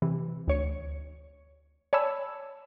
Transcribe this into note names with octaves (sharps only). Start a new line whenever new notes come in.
C3 E3
D2 C#5 C#7
C#5 D5 G#5 A5 B5 E6